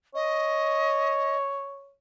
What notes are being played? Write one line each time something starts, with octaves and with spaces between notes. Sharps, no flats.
C#5 D#5